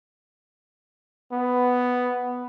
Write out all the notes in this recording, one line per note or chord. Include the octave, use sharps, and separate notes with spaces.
B3